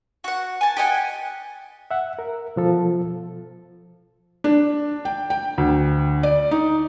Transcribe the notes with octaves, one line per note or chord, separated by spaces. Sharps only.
F#4 F#5
G#5 A5
G4 D#5 F#5 G#5
E5 F#5
A#4
B2 F3 A4
D4
G5
G5
D2
D5
D#4